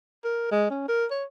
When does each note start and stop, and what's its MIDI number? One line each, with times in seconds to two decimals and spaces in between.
0.24 0.49 70
0.51 0.67 56
0.70 0.88 61
0.89 1.05 70
1.11 1.24 73